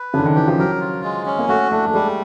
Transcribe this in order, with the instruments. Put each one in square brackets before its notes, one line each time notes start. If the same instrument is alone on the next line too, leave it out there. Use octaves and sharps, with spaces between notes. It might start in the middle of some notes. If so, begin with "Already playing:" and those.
Already playing: [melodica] B4
[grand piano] C#3 [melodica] D4
[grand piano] D3
D#3
[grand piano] E3 [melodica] G4
[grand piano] F3
[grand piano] F#3 [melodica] A#4
[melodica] F4
G#3
C#4
[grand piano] A#3
[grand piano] A3 [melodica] F#4
[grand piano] A3 [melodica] D4
[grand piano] A3
[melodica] G3 [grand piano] G#3